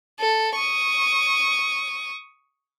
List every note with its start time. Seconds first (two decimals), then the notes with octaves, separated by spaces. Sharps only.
0.20 A4
0.57 C#6 D#6